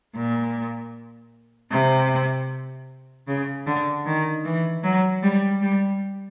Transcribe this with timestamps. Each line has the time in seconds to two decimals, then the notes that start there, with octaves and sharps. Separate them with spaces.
0.16 A#2
1.71 C3
3.28 C#3
3.67 D3
4.06 D#3
4.45 E3
4.84 F#3
5.23 G3
5.62 G3